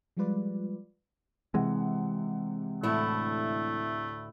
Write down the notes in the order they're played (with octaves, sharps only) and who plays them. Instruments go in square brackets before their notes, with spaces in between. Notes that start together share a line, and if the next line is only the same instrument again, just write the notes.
[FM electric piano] F3 G3 G#3 F4 B4 D5
[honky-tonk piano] C3 F#5 [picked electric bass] E3 G#3
[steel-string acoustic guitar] D2 A2 E4 [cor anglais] A3